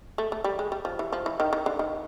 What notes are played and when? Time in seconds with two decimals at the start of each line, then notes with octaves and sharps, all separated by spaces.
0.18 A3
0.32 A3
0.44 G3
0.59 G#3
0.72 G3
0.85 F3
0.99 E3
1.13 F3
1.26 E3
1.40 D#3
1.53 D#3
1.66 D3
1.79 D#3